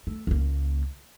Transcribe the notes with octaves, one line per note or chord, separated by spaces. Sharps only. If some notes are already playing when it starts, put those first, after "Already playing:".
A3
C#2 A#3